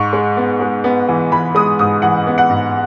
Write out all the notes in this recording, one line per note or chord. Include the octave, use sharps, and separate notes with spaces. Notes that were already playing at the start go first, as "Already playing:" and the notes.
Already playing: G#2 C#6
G#3
B3
G#3
B3
E3
E3 B5
G#3 D#6
G#2 D#6
E3 F#5
B3
F#5
G#2